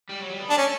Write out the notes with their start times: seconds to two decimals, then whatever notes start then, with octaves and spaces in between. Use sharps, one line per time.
0.09 G3
0.20 F#3
0.30 G3
0.39 B3
0.50 A3 D4
0.57 C#4